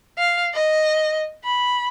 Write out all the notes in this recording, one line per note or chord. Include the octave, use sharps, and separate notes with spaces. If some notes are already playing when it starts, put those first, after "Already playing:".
F5
D#5
B5